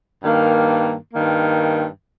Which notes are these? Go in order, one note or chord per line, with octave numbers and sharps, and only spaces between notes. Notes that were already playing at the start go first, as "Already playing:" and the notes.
G2 D#3 A#3
G2 D#3 A#3